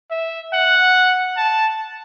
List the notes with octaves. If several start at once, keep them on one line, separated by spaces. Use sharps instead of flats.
E5
F#5
A5